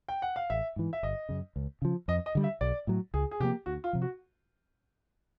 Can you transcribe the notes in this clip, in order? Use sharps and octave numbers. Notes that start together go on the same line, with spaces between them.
G5
F#5
F5
A1 E5
G#2 E3
E5
G1 D#5
F#2 C#3
C#2
C#3 F3
F2 D#5
D#5
D3 G3
E5
B1 D5
A2 F#3
C#2 G#4
G#4
C3 F3 A#3 G4
D2 F#4
F4
C3 F3
F#4